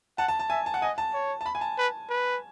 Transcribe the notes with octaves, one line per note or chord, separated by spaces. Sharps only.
F#5 A5
A5
A5
E5 G#5
A5
F#5
D#5 G#5
A5
C#5
A5
B5
G#5
A5
B4
B4